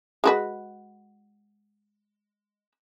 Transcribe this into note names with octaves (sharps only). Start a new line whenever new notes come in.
G#3 F#4 B4